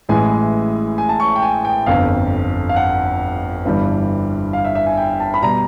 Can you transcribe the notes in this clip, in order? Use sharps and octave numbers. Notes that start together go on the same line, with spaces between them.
A1 A2 E3 G#3 G#5
G#5
A5
C#6
G5
G#5
G5
G1 F2 D3 F5
F5
F#5
G1 G2 E3 G3
F5
E5
E5
G#5
G5
A5
B5
B2 G3 A#5